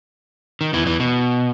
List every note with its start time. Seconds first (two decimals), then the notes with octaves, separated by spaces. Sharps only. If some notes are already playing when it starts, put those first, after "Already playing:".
0.61 D#3
0.73 E2 E3
0.86 E2 E3
1.00 B2